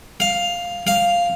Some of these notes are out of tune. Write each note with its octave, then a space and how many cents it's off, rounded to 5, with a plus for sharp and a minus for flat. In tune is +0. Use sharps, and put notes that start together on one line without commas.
F5 +5
F5 +0